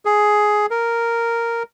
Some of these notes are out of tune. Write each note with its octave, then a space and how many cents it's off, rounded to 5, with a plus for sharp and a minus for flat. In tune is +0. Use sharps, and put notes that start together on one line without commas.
G#4 +10
A#4 -5